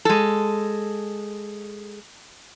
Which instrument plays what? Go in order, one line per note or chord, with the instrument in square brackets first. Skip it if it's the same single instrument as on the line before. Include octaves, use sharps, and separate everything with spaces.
[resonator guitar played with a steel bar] G#3 A4